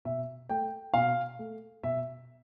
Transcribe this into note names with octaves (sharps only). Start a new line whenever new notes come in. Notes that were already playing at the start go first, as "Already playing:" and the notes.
B2 E5
A3 G5
B2 F5
A3
B2 E5